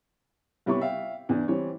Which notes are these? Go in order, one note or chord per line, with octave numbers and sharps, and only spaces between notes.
C2 G3 B3 E4 C#5 C#6
E5 F5 G5
E2 D4
E3 G3 C4 C#5